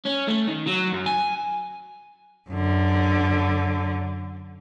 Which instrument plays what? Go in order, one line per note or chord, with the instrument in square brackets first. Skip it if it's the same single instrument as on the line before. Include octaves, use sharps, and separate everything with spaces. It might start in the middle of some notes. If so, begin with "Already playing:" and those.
[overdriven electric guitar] C#4
A3
D#3
F#3
F#2
G#5
[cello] F#2 D3